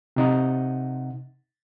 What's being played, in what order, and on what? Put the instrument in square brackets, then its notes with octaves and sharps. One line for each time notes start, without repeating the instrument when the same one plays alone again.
[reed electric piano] C3 D#4 F#5